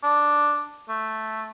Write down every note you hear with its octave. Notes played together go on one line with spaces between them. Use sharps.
D4
A3